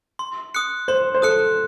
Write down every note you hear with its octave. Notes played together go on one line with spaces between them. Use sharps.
C6
D#6 F#6 C#7
C5 C6
C5
A4 D#6 F#6 C#7